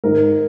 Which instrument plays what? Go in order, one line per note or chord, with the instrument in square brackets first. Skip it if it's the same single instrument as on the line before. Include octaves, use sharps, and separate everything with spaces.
[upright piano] G#2 D#3 A#4